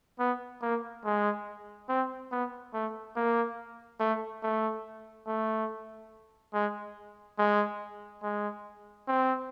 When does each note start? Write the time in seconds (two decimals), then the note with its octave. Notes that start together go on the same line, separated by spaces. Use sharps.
0.20 B3
0.62 A#3
1.05 G#3
1.89 C4
2.32 B3
2.74 A3
3.16 A#3
4.00 A3
4.43 A3
5.27 A3
6.54 G#3
7.39 G#3
8.23 G#3
9.08 C4